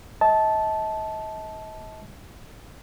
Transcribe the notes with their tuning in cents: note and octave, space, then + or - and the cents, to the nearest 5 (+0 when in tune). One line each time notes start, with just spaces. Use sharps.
D#5 +40 A5 -10